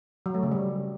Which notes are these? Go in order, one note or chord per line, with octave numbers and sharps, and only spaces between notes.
F#3
A3
C#3
G3